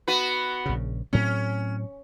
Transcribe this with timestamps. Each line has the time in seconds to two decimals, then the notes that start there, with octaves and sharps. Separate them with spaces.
0.08 B3 F#4 B4
0.66 A#1 C#3
1.13 A2 F#3 C4 C#4